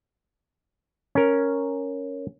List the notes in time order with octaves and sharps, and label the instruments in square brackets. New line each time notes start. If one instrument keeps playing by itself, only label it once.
[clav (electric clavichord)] C#4 A#4